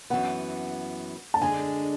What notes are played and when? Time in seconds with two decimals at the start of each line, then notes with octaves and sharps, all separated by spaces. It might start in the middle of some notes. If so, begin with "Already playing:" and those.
0.10 F#2 E3 B3 F#5
1.34 A5
1.42 D3 G#3 D4 G#4 G#5